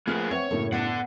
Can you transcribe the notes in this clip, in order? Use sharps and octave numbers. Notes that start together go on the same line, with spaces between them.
F3 A3 A#3 G#4 B4 F6
C4 B4 C#5 E5 F#5
F#2 A2 C#3 A#3 A4
B3 D5 F#5